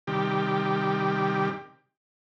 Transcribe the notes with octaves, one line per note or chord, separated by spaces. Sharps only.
C3 D#3 G3 G4